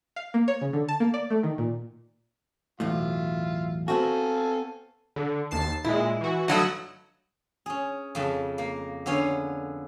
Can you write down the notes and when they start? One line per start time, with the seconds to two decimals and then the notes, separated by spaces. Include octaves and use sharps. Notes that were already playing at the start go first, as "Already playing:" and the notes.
0.16 F5
0.34 A#3
0.48 C#5
0.61 C#3
0.73 D3
0.88 A5
1.00 A#3
1.14 D5
1.30 A3
1.43 D#3
1.58 A#2
2.80 B1 E2 A2 F4 E5
3.88 B3 C4 F#4 A4 F5 G#5
5.16 D3
5.51 D#2 A5 C7
5.84 A#2 G#3 E4
6.21 E3 F#4
6.48 G2 F#3 A3 D#5 F#5 E6
7.66 C#4 G#4
8.15 F2 C#3 A5
8.58 A#3
9.06 D3 B3 C#4 C#5 F5